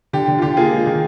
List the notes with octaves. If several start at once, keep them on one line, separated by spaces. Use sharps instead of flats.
D3 G4
D3
F4
D3 G4
A#3 F4 G#4
G#3
D#3